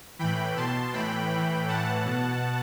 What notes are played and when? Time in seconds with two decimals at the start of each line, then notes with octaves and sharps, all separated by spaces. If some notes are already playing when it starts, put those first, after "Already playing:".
0.19 A2 E3 G5 B5
0.56 B2 A5 C6
0.93 A2 E3 G5 B5
1.31 A2 E3
1.68 A2 E3 F#5 A5
2.05 B2